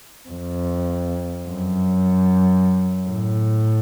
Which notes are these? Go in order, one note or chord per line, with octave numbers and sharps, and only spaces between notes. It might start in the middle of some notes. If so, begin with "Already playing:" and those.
F2
F#2
A2